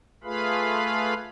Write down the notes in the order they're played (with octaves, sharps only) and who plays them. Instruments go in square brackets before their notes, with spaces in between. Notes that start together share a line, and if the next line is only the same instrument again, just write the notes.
[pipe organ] A3 F4 G#4 B4 F5 B5